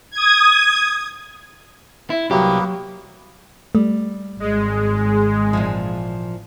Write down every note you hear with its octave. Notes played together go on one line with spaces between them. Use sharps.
D#6 G#6
E4
C2 F#3 A#3 B3 G4
G3 A3
G#1 G#3
A#2 E3 F3